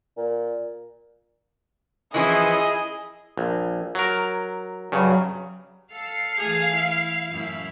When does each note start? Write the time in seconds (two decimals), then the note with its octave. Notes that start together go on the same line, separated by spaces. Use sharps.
0.17 A#2
2.14 E3 F3 C#4 E4 G#4 D#5
3.37 A#1
3.95 F#3 A#4
4.92 G2 C#3 F#3
5.92 A4 F5
6.38 E3 A3 G#4
6.75 E4
7.30 F#2 A2 E4